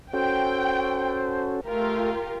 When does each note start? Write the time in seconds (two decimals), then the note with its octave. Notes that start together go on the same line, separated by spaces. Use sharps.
0.13 C#4 F#4 A4 C5 G5
1.67 A3 F4 G4 A#4